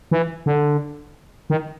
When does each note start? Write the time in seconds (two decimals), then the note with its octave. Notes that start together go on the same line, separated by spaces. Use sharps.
0.11 E3
0.46 D3
1.50 D#3